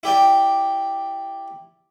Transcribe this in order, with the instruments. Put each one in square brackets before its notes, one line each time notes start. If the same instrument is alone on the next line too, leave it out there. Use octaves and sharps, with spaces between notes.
[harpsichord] E4 G4 D5 G5